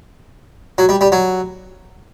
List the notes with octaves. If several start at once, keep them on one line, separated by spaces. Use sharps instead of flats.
F#3
G3
G3
F#3